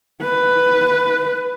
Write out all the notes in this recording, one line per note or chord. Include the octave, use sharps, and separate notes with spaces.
B4